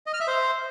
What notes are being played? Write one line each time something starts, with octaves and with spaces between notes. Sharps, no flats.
D#5
F6
E5
C5